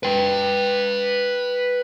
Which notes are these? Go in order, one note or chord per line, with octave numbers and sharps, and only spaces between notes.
B4 G5